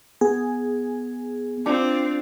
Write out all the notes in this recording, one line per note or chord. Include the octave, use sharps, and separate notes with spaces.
B3 G#4
C4 D4 F4